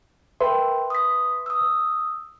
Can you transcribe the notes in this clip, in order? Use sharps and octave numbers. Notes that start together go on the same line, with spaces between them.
A#4 B4 E5 G5 C6
D#6 B6
D#6 E6